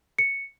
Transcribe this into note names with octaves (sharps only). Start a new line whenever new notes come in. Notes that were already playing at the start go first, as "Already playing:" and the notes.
C#7